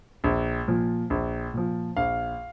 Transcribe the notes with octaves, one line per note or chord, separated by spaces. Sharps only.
A#1
A#2 F3
A#1
A#2 F3
A#1 F5